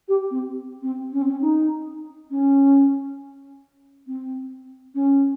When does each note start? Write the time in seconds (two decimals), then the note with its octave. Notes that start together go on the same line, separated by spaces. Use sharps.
0.09 G4
0.31 C4
0.83 C4
1.13 C#4
1.22 C4
1.31 C#4
1.41 D#4
2.31 C#4
4.07 C4
4.95 C#4